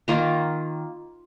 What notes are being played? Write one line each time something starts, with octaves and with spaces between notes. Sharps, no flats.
D#3 A#3 F4 A#5